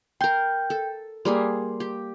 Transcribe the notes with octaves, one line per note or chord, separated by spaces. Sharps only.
A#4 G5 C6 G6
A4
G3 A#3 G#4 C6
G4